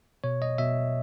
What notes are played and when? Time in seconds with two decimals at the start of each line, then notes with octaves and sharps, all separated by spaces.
0.24 B2 C#5
0.42 D#5
0.58 B2 E5